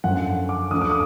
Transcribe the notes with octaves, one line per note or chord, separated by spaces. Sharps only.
F#2 D3 F3 F#5
D6
D2 D3 F3 D#6
D6
D#6